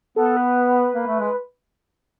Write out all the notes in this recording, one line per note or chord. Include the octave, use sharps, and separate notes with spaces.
B3 A4
B4
A#3
A3
G#3